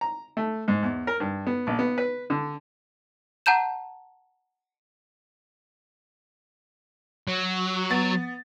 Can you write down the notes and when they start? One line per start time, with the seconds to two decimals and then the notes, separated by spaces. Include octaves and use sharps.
0.01 A#5
0.37 A3
0.68 G#2
0.83 E2
1.07 A#4
1.20 G2
1.47 B3
1.67 A#1
1.79 B3
1.98 B4
2.30 D3
3.46 F#5 A5 A#5 G6 E7
7.28 F#3
7.90 B3 A6